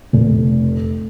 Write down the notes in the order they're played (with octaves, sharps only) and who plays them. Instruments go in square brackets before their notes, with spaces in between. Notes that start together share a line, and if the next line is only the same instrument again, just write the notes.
[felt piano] F1